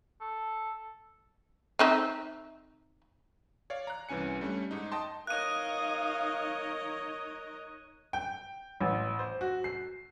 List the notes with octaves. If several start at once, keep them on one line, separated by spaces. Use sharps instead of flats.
A4
C4 D#4 E5
C#5 D5 F5
A#5 F#6
C2 E3 C#4 G#5 C#7
G3 A3 C#4 D4
G#2 D#4
D#5 G5 A5 C6
D#4 A#4 C#5 D#5 F5 D#6 F#6 D#7
G5
A1
C5
F#4
C7